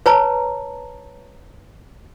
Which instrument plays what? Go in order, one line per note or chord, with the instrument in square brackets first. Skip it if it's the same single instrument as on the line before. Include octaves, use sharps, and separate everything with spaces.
[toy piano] B4 C#5 A5 A#5